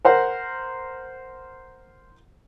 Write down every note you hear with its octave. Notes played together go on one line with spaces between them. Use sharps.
A#4 C5 F#5